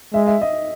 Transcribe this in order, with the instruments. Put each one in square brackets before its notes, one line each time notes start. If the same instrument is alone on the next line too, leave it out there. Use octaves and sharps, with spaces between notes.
[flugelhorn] G#3 [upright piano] E5
[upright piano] E5
D#5